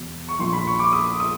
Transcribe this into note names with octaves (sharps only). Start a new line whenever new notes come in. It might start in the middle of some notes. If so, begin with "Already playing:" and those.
Already playing: E2 B2
C#6
A#1 A#2 F3 C6
B5
C#6
D6
D#6
D#6